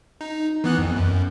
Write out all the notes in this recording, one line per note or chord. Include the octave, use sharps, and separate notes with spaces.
D#4
E3 B3 F#6
F2
F#2